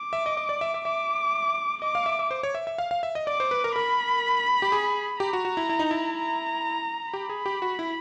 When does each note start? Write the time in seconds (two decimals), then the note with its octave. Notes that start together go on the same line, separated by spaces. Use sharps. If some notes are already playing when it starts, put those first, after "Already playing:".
Already playing: D6
0.13 E5
0.26 D#5
0.37 D#5
0.49 D5
0.61 E5
0.74 E5
0.85 E5 D6
1.82 D#5 D6
1.95 F5
2.06 E5
2.19 E5
2.31 C5
2.43 C#5
2.55 E5
2.67 E5
2.78 F5
2.91 F5
3.03 E5
3.15 D#5
3.27 D5 D6
3.40 C5
3.51 B4
3.64 A#4
3.75 A#4 B5
4.62 G4
4.72 G#4
5.20 G4 A#5
5.33 F#4
5.45 F#4
5.57 E4
5.69 E4
5.79 D#4
5.91 E4
6.18 A#5
7.13 G4 B5
7.29 G#4
7.46 G4
7.62 F#4
7.79 E4